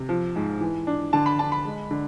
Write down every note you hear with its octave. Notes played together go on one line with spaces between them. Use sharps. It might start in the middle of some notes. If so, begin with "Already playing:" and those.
Already playing: C3
F3
G#2
E3
D4
D3 A5
B5
D4 A5
B5
G#3
D3